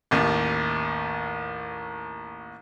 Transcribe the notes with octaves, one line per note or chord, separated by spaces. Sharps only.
A1 D#2